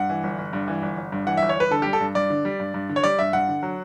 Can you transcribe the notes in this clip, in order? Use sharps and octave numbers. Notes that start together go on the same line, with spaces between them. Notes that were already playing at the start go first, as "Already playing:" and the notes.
Already playing: G2 F#5
E3
G1
G1
G2
E3
G1
G1
G2
E3 F#5
G1 E5
C#5
G1 B4
D3 A4
G3 G4
A4
G2
G2 D5
D3
G3
G2
G2
D3
C#5
G3 D5
G2 E5
G2 F#5
D3
F#3